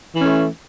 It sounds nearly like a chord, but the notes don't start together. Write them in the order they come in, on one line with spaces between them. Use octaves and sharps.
E3 C#4 A3